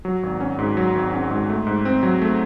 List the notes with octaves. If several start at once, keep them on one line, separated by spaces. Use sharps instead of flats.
F#3
G#1
C#4
G#2
F#3
G#1
C#4
G#2
A3
G#2
C4
F#3
A3